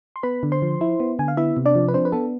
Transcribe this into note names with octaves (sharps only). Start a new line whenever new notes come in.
C6
B3 B4 B5
D3
C5 C6
F3
E4
B3
D3 G#5
F5
B3 E4 E5
C3
D4 D5
F3
B4
C4 D4 C5
B4
B3 A4